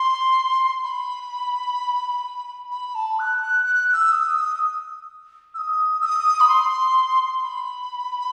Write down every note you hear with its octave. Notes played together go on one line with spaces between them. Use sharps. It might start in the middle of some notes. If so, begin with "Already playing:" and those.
Already playing: C6
B5
B5
A5
F#6
F#6
F#6
F#6
E6
D#6
E6
D#6
E6
D#6
E6
D#6
B5
C6
B5